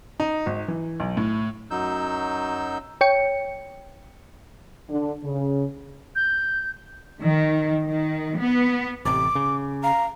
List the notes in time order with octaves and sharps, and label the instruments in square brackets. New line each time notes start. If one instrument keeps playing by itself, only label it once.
[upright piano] D#4
G#1
E3
B1
A2
[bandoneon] F#2 F#3 D#4 E6 G6
[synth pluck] C#5 G5 C#7
[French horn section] D3
C#3
[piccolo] G6
[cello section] D#3
D#3
B3
[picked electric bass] A1 C3 [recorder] D6
[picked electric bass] C#3
[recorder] F5 [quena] A#5